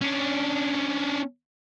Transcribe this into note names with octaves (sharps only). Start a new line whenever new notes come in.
C#4 D4